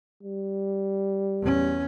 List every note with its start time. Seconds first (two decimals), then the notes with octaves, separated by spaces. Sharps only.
0.23 G3
1.41 E2 C#4